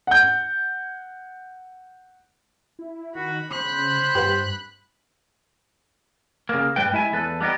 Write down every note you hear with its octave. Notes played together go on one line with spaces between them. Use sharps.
F#5 G6
E4
D#3 F#4 B5
C#3 C5 B5 F#6
G2 G4 B4 F#5
C#3 A#3
G2 G3 B4 G5
G#3 E4 E5 G#5
E2 A4 B4
G3 B3 D#4 G4